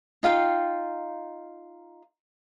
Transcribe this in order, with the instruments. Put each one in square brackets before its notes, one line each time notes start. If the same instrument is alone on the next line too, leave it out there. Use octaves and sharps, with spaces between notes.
[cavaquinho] D#4 F4 F5 G5